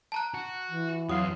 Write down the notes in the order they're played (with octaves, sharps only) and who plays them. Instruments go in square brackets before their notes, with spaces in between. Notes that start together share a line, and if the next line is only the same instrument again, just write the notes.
[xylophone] A5 A#5 F#6
[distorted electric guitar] F#4
[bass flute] E3
[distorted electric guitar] F2 [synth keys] F#3 F5 C6 [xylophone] D#6